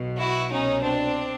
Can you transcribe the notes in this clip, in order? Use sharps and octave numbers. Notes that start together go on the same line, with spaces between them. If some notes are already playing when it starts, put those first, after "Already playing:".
Already playing: B1 B2
E4 F#4
C2 B2 C#4 D#4
C4 D4